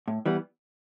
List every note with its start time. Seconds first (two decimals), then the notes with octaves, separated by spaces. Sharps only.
0.08 A2
0.26 E3 G3 B3